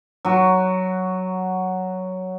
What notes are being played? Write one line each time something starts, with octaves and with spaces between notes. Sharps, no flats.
F#3 F#4